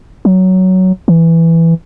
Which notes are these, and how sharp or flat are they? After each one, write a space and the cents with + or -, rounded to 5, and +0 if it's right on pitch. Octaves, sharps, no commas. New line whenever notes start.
F#3 +10
E3 +5